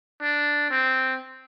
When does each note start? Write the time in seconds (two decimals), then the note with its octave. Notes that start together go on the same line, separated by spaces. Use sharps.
0.22 D4
0.71 C4